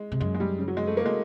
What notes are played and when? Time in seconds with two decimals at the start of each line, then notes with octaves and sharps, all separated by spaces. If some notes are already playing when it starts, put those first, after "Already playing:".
Already playing: G#3
0.12 C3
0.20 F#2 G#3
0.35 G#3
0.40 G3
0.58 C#3
0.68 F#3
0.77 G#3
0.87 A3
0.97 A#3
1.06 G#3